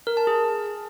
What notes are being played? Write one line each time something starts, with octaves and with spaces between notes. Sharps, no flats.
A#4
A5
G#4